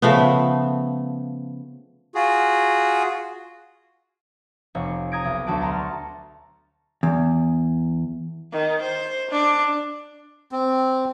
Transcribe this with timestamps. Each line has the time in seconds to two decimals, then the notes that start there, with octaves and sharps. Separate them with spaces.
0.02 C#3 F3 A3 B3
2.15 F4 F#4 G#4
4.75 F1 C#5
5.12 A#5 D#6 G#6 A#6 D7
5.25 B1
5.47 D2 F#3 F#4 A5 D7
5.61 A5 A#5 C6
5.72 C#6 F6
7.03 E2
8.52 D#3
8.81 C5
9.31 D4
10.52 C4